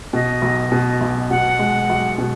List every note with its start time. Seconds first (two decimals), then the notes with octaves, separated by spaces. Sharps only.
0.13 B2 D#5
0.42 B1
0.72 B2
1.01 B1
1.31 B2 F#5
1.59 G#3
1.90 B1
2.18 B2